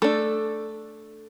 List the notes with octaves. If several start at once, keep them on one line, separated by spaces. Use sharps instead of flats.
A3 D4 A4